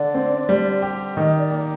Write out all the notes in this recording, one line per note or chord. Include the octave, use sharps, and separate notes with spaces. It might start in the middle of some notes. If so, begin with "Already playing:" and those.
Already playing: D3 D5
C4
G3
G4
D#3 D#5
D5
A#3